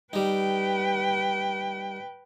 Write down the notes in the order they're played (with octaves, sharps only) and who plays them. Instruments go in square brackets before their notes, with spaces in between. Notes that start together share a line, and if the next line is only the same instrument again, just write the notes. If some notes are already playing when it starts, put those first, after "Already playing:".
[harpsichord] G3 D#4 [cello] B4 G5